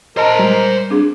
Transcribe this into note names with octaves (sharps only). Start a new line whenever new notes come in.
A#4 C5 D#5 A5 A#5
G3 G#3
C4 D4 G#4